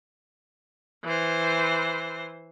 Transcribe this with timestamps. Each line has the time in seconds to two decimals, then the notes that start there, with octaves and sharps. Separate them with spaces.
1.04 E3 C5